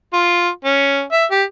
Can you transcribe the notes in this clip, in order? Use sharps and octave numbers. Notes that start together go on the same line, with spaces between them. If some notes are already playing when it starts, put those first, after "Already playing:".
F4
C#4
E5
G4